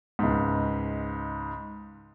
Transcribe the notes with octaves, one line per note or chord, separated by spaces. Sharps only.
C#2 G#2